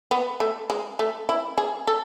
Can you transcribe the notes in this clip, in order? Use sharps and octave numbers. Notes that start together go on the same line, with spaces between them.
B3
A3
G#3
A3
E4
G#4
A4